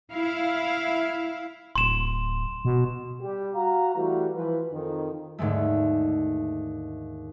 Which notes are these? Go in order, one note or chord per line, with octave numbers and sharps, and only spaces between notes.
E4 F5
D1 C6 E7
B2
G3 G4
F#4 F5 A#5
E3 G3 A3 F#4
E3 F3 B4
F2 D#3
D#2 G#2 D3 G#3 A3